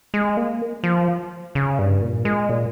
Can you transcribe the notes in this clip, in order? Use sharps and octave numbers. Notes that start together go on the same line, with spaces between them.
G#3
A#3
F3
C#3
G2
A#2
G#3
A#2